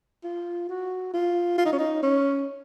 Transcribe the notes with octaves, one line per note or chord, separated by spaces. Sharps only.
F4
F#4
F4
F4
D#4
C#4
D#4
C#4